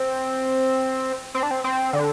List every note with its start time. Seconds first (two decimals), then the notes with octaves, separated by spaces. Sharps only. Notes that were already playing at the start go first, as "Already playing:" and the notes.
Already playing: C4
1.34 C4
1.43 D4
1.51 C4
1.64 C4
1.93 D3